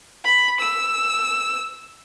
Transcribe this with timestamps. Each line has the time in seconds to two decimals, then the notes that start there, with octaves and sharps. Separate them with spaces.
0.24 B5
0.60 E6